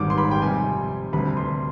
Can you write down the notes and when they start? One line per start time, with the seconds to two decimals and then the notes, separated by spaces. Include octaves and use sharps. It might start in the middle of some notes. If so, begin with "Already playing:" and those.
Already playing: G#1 G#2 D#3 G3 D6
0.10 C6
0.18 B5
0.31 G5
0.41 F2 C3 G3 G#5
1.13 D2 C3 G3 B5
1.37 C6